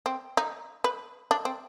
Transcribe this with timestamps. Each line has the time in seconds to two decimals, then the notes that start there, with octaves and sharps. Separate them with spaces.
0.06 C4
0.37 D#4
0.84 B4
1.31 D4
1.45 C4